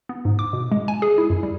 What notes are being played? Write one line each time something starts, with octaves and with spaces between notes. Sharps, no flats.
B3
G#2
D6
B2
G#3
G#5
G#4
E4
F#2
G3